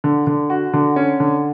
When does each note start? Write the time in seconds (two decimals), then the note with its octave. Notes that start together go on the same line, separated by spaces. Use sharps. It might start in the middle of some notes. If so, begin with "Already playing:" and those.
0.04 D3
0.27 D3
0.50 F#4
0.73 D3
0.96 C#4
1.20 D3